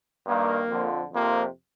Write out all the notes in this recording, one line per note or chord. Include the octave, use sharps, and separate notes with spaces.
G2 D#3 G3 A#3
F2 D3 F3
F2 C3 F3 A#3